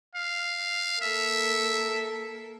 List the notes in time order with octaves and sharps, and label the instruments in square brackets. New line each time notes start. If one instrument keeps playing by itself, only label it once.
[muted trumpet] F5
[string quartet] A#3 A4 A#4 [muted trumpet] E5